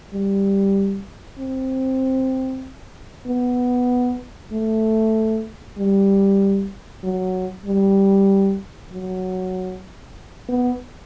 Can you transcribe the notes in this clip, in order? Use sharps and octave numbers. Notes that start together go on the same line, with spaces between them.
G3
C4
B3
A3
G3
F#3
G3
F#3
B3